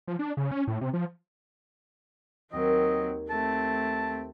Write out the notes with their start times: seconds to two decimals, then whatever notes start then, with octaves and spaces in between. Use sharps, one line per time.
0.07 F3
0.19 D4
0.37 C#3
0.51 C#4
0.67 A2
0.81 C3
0.93 F3
2.53 D#2 F#3 C4 D#5
3.30 A3 C4 A5